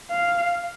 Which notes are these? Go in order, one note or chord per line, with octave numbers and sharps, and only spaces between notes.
F5